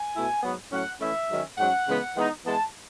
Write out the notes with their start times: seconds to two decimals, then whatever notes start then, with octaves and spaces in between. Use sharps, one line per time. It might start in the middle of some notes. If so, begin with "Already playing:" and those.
Already playing: G#5
0.14 B2 A3 E4
0.43 G#2 F#3 B3
0.71 A2 F#3 C#4 F#5
1.00 E3 A3 C#4 E4 E5
1.29 G#2 D#3 F#3 C#4
1.58 G#2 F#3 C#4 F#5
1.87 C#3 E3 G#3 B3
2.15 E3 G#3 B3 D#4
2.44 E3 G#3 B3 A5